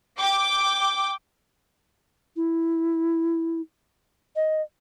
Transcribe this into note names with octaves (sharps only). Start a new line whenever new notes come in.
G5 D6
E4
D#5